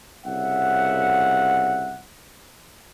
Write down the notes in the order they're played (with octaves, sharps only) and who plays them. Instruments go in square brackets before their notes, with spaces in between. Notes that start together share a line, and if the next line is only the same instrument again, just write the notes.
[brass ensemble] C2 C#3 E5 F#5